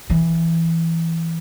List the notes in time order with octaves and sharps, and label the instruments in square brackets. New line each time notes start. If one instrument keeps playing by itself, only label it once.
[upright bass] E3